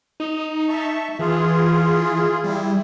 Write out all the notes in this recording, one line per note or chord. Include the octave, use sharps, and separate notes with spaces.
D#4
E5 A5 C#6
E3 F4 G#4
G3 E4